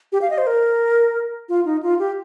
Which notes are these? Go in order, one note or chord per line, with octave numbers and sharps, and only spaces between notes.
G4
F5
D#5
C5
A#4
F4
D#4
F4
G4